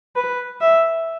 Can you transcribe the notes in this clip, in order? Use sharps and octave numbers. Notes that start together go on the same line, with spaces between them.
B4
E5